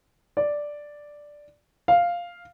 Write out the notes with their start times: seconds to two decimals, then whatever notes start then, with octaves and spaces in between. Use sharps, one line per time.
0.37 D5
1.88 F5